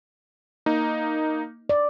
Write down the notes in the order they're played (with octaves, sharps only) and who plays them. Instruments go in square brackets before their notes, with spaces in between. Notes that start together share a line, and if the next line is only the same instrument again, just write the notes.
[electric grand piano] A#3 D#4
[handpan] D5